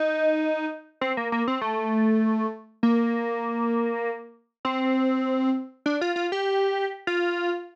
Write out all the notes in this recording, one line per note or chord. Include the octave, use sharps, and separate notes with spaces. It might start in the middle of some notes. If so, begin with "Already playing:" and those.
Already playing: D#4
C4
A#3
A#3
C4
A3
A#3
C4
D4
F4
F4
G4
F4